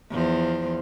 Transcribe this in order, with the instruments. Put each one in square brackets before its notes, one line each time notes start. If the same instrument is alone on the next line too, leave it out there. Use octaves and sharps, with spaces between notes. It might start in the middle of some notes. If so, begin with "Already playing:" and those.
[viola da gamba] E2 F3 C5